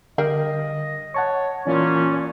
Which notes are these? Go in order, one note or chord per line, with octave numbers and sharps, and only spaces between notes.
D3 G3 A#4 D#5 F5
C#5 F#5 A5 C#6
A#2 E3 A#3 C#4 F4 D5